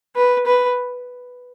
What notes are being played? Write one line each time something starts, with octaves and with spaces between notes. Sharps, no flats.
B4
B4